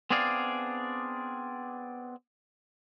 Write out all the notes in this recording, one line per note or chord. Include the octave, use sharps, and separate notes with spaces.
B3 C4 D4 G#4 D5 F5